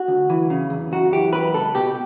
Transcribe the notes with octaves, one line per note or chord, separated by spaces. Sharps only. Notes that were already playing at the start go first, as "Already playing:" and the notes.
Already playing: F#4
D2
E3
C#3
E2
F#2 F#4
E3 G4
F#2 B4
C#2 A4
B2 G4